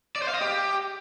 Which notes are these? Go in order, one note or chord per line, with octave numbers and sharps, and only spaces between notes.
D5
C5
F5
D#5
G4